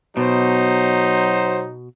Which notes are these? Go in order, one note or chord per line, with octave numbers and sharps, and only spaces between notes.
B2 F#3 D#4 C5